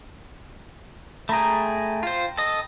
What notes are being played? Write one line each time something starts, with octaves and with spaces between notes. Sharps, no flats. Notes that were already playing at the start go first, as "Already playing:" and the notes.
A3 G#4 G5 A#5 B5
F4 C5
A4 D#5